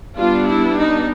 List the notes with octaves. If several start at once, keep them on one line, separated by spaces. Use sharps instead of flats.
G3 B3 D4 F4
E4
D#4